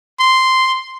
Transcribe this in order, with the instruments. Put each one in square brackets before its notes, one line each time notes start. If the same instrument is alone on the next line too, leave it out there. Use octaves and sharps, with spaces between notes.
[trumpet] C6